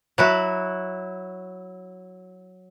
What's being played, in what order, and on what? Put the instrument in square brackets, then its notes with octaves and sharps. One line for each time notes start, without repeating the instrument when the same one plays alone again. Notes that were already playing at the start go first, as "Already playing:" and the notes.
[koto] F#3 E4 F#4